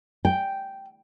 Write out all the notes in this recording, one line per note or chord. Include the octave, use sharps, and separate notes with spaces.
G5